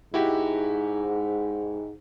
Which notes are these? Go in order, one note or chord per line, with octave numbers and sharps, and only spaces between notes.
G#2 E4 F#4 G4